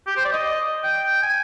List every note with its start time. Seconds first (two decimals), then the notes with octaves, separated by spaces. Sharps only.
0.07 G4
0.17 C5
0.25 D5
0.33 D#5
0.84 G5
1.22 G#5